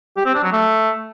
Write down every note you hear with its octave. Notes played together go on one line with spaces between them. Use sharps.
G4
C4
D4
F#3
A3